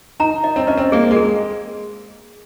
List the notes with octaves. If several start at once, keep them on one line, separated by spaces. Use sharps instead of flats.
D#4 A#5
D#5
C4
C#4 D#5
C4
A#3 G#4
G#3
G#4